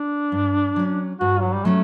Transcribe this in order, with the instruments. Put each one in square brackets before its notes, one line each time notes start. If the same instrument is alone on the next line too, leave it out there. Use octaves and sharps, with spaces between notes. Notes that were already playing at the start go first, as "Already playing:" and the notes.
Already playing: [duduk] D4
[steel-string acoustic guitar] G2
F#3 C#4
[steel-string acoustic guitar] G2 [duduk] F#4
[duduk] F#3
G3
[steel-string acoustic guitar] F#3 C#4 [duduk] A3